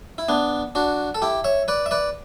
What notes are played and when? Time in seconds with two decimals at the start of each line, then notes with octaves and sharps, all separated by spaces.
0.18 E4
0.29 B3 D4
0.75 D4 F#4
1.15 A4
1.22 E4 G4
1.44 C#5 E5
1.68 B4 D5
1.86 E5
1.91 B4 D5